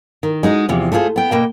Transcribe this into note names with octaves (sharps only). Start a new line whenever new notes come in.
D#3
G#3 D#4 F#4
E2 C3 F3
A3 E4 F4 G#4 C5
B3 G5
B2 A#3 G5